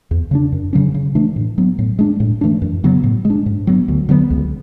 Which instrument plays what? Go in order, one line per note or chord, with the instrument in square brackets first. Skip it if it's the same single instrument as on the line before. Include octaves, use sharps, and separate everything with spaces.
[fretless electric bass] E2
C#3 G#3 D4
F#2
C#3 F#3 C#4
C#3
E3 A3 D4
A2
F#3 B3
A2
G#3 D4
A2
E3 A3 D4
F#2
C#3 F#3 B3
A2
G#3
D4
G#2
F#3 B3
D2
D3 F#3 B3
C#2